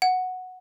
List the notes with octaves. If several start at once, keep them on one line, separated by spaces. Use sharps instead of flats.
F#5